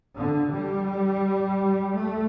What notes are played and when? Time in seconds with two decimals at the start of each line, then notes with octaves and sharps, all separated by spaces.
0.17 D3
0.53 G3
1.95 A3